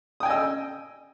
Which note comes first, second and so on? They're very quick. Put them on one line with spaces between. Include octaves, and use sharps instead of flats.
D#6 G5 G#5 D#5 E6